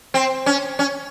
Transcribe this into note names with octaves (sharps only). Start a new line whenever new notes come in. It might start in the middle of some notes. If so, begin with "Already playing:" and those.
C4
C#4
C#4